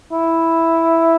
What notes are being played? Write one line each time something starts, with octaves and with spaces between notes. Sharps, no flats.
E4